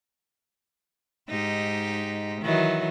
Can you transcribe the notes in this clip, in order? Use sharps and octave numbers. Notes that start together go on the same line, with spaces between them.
G#2 D#4 G4
D#3 E3 F#3